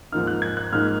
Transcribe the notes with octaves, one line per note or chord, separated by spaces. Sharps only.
G#2 F3 A#3 D#4 F6
F#6
G#6
F#6
G#2 F3 A#3 D#4 F6